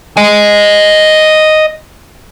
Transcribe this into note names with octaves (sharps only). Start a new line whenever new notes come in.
D#5 G#5